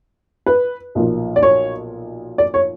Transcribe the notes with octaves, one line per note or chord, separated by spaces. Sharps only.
B4
B1 A#2 F3
D5
C#5
D5
C#5